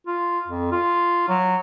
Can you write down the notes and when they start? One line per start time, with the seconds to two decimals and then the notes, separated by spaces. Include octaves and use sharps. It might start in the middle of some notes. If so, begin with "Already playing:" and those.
0.07 F4
0.48 F2
0.71 F4
1.28 F#3